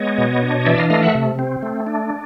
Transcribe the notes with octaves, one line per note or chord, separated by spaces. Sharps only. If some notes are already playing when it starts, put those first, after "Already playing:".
Already playing: G#3 B3 C#5 D#5
B2
D4
E3 D5 E5
D#5 F5
A3 D#5 F5
E5 F#5
C3
C4
A3
D4